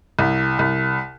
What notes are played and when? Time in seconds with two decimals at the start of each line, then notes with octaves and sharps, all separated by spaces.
0.19 C2
0.59 C2